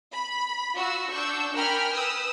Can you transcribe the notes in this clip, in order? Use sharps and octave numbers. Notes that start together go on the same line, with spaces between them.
B5
F4 F#4 E6
D4 C#6 E6 G6
A#4 G5 G#5 B5 F6
B4 D#6 E6